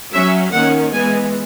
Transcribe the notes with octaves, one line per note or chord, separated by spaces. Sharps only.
F#3 C#4 E5
D#3 A#3 C#4 F#5
E3 G#3 B3 G#5